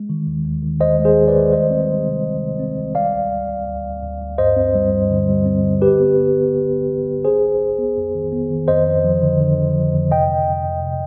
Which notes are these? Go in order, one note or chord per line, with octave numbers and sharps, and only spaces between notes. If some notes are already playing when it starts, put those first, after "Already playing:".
Already playing: G#3
D#3
D#2
D#2
D#3
D#2 C5 D#5
G#3
G#4 C5
G#3
B4 D5
D#3
G3 C5 D#5
C4
G3
C3
C2
C3
C4
C2
G3 D5 F5
D2
D2
D2
D2
D2
D2
D2
G2 C5 D#5
C4
G3
G2
D3
G3
C4
D3
B1 G4 B4
B3
B3
B3
B1
B3
B1
B1
G1 G#4 C5
G1
G1
B3
F2
D#3
B3
D#3
F2 C5 D#5
F2
F3
D3
D3
F2
F3
F2
C3 D#5 G5
F2
F2
F2
C3